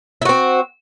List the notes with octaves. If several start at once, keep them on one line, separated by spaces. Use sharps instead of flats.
C4 E4 F#4